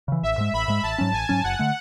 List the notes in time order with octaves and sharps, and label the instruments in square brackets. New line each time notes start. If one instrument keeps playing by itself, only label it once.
[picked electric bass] C#3 E3
[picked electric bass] A1 [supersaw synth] E5
[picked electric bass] G#2 G#3
[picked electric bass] A1 [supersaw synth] B5
[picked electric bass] G#2 G#3
[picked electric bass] A1 [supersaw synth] A5
[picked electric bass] G#2 F#3 C#4
[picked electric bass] A1 [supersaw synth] G#5
[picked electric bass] G#2 F#3 C#4
[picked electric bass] F#1 [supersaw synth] F#5
[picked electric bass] D3 A3